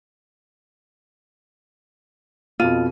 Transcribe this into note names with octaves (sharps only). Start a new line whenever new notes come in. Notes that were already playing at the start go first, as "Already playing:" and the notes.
F2 B2 F4 D#7